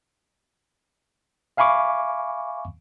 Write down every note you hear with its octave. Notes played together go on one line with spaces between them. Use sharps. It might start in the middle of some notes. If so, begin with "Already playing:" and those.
E5 F5 G#5 B5 C#6 D6